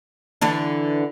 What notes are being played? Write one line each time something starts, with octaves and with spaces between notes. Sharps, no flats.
D3 E3 D4